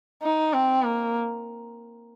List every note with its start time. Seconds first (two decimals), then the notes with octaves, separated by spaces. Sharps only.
0.23 D#4
0.54 C4
0.85 A#3